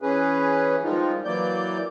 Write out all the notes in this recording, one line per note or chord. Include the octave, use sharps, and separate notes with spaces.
E3 C#4 G#4 B4
D#3 F3 G3 G#3 D#4 F4
E3 F#3 A#3 D5 G6